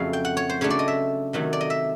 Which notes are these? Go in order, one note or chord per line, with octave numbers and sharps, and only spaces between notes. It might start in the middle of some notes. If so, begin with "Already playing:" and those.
Already playing: F2 C#3 F#3 A3 F5
G5
F#5
C#5
C5
C#3 F#3 A3 D4 C#5
D5
D#5
E5
C3 D#3 F#3 A3
D5
D#5
E5